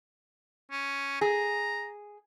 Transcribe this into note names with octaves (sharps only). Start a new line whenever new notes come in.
C#4
G#4 A#5